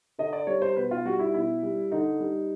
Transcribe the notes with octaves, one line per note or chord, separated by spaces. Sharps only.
D3 D#5
D5
G3 C#5
C5
B2 B4
F4
G3 F#4
E4
B2 E4
G3
D3 D#4
G3